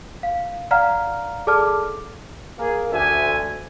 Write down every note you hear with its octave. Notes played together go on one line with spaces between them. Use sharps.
F5
D5 F5 F#5 A#5 F6
G#4 A4 D5 A5 D6 F6
A#3 G#4 A#4
D2 E5 G#5